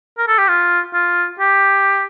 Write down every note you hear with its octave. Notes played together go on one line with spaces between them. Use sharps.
A#4
A4
G4
F4
F4
G4